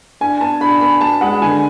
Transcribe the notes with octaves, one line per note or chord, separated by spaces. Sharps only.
D4 G#5
B3 A5
D4 B5
B3 B5
B3 A5
G#3 F#5
D3 G#5